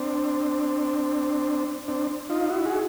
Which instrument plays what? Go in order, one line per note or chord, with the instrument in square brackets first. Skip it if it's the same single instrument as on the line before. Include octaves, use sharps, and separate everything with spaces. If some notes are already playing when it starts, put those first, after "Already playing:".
Already playing: [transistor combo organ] C4 D4
C4 D4
D#4 F4
E4 F#4
F#4 G#4